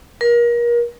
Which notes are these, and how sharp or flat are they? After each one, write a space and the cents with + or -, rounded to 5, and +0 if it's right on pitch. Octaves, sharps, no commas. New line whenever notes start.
A#4 +30